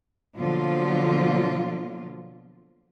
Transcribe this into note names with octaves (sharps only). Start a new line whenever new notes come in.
B2 D3 F3 F#3 A#3 F4